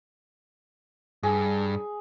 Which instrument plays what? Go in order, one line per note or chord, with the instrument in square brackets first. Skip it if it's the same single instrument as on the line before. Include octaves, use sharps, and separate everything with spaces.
[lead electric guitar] G2 [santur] G#4